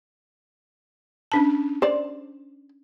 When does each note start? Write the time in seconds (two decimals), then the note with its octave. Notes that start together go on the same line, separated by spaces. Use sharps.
1.32 C#4 D4 A5
1.82 C5 D5